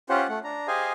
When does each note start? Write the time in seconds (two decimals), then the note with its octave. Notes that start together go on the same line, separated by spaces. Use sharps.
0.09 C#4 F4 G4 C5 F#5
0.29 A3 F#5
0.44 D4 A#5
0.68 G4 G#4 C5 D#5 F5 G#5